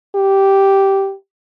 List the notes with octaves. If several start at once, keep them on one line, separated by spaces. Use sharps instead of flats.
G4